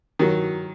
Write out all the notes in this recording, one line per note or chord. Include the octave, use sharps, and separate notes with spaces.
D#3 F#3